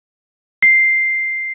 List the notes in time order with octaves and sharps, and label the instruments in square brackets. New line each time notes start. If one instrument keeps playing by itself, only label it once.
[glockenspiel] C7